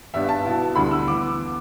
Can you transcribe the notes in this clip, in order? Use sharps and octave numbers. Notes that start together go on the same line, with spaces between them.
G2 G3 B3 D4 E5
A5
B2 B3 E4
D2 D3 G3 E4 B5
E6
E3 B3 D6